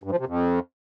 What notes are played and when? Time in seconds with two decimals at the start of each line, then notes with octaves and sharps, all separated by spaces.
0.04 G2
0.11 F3
0.19 C3
0.27 F2